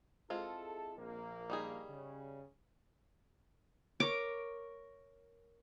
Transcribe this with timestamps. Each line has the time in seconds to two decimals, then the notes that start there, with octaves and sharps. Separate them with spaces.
0.30 G#3 C4 E4 F4 G#4 A4
0.97 A#1 A#3
1.50 G3 D#4 G#4
1.89 C#3
4.00 A#4 C#5 D6